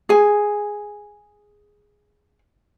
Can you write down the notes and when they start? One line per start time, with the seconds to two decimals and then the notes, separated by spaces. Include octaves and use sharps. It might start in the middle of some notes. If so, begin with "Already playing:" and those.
0.09 G#4 G#5